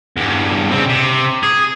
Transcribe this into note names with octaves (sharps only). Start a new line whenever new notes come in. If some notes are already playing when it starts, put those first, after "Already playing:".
E2 G2
C#3 C4
C3
G#4